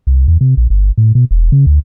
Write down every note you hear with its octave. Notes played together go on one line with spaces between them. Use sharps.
C2
E2
C3
A#1
G1
A2
B2
E1
C#3
D2